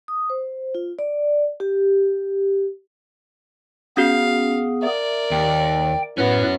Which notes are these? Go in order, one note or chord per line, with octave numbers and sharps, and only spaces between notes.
D#6
C5
F4
D5
G4
B3 C#4 F#4 G#4 F5
A#4 D5 E5
D#2 G5
A2 B3 C#4 F#4 B4